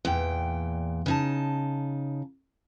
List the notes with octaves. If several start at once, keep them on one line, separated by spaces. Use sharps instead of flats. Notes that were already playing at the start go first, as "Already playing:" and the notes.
E2 A#2 G5
C#3 D#4 A5